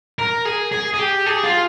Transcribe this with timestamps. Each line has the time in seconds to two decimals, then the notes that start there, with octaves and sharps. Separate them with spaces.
0.19 A#4
0.45 G#4
0.72 G#4
0.93 G#4
0.99 G4
1.26 G#4
1.44 F4